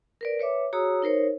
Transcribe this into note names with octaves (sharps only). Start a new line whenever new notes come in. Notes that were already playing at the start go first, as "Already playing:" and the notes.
A#4 B4 D5
B4 C#5 E5 D6
F#4 G#4 C#5 A#5 D#6 E6
D#4 A#4 C5 C#5